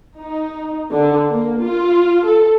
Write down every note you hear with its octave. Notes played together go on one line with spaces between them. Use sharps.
D#4
D3
A#3
F4
A4